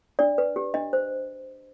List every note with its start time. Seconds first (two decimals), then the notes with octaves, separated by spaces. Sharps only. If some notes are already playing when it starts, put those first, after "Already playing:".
0.19 D4 D5
0.38 B4
0.56 G4
0.74 D4 D#5
0.93 C5